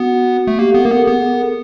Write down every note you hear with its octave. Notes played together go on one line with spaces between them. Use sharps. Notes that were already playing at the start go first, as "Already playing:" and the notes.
Already playing: B3 F#4
A3
A#3 G4
B3 A4
A#3 A#4
B3 A4
B3 G#4
A#4
A4